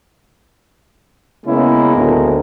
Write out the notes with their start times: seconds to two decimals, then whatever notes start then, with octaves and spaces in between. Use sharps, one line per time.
1.46 C#3 G#3 A#3 B3 C#4 E4
1.94 D2 A2